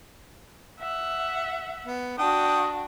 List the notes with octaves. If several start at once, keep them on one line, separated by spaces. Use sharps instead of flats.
E5 F#5
B3
D4 F#4 G5 D#6